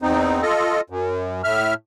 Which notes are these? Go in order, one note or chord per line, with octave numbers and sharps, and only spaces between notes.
E2 C4 D#4
F4 A4 D#5
F#2
A2 E5 F6